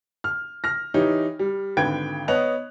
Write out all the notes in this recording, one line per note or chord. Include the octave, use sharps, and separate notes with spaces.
F6
F6 A#6
E3 D#4 G4 C#5
G3
G#1 D3 B4 G5 G#6 D7
B3 C#5 D#5 F#6 F7